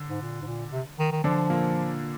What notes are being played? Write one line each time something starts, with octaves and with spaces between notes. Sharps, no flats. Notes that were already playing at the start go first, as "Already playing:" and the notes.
Already playing: D3
G#2
A#2
G#2
A#2
C3
D#3
D#3
D3 F3 D4
A#2 A#3